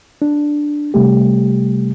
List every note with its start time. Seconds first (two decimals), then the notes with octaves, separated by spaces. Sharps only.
0.22 D4
0.94 C3 G3 A3 G4